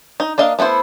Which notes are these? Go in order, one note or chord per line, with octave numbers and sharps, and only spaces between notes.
D#4
A#3 D4 D#5 F5
A3 B3 E4 C5